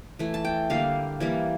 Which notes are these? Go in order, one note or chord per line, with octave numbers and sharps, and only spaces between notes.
E3 A3
A5
G5
D3 G3 A#3 F5
E3 G3 A#3